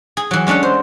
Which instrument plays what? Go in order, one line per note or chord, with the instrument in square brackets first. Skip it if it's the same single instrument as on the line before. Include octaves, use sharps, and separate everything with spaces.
[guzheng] G#4
E3 F#3
G#3 C#4 D4 A4 F#5
C5